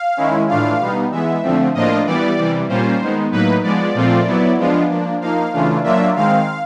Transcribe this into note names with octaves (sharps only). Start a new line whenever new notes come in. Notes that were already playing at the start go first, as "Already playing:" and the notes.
Already playing: F5
D#3 G#3 C#4 E4
A2 E3 A3 D4 F4 F5
B2 G3 B3 D#4
E3 G#3 B3 E5
D3 F3 A3 C4
A2 F3 A#3 D4 F4 D#5
E3 G3 B3 D5
C3 E3 G3
A#2 G3 A#3 C#4 F4 C5
D#3 G#3 B3 D#4
A2 F#3 A#3 D#4 B4
F3 G#3 B3 D5
A#2 F3 A3 C4 F4
F#3 B3 E4
F3 G#3 B3 D4 F4
F3 A#3 D4
F3 A#3 D#4 F5
C#3 E3 A3 D4 F4
F#3 A#3 D4 F4 E5
D#3 G#3 C4 F5